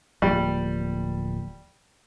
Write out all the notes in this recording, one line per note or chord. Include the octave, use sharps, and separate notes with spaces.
D1 F3 G3 A#3